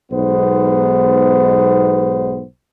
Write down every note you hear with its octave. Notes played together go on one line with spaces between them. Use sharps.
B1 G#2 B3 D#4 C5